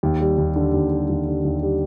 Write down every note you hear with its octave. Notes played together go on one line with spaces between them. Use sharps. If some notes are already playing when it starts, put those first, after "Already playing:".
D#2
G3
D#2
D3
D#2
G3
D#2
D3
D#2
G3